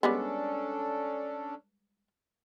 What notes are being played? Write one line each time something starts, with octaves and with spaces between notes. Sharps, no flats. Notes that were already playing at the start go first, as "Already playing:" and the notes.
G3 G#3 B3 C#4 D4 A4